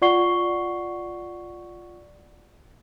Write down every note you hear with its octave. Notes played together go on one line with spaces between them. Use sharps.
F4 D5 F#5 C#6 C7 G7